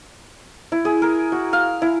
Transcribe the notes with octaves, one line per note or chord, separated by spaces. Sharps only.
E4
G#4
A#4
F#4
F5
E4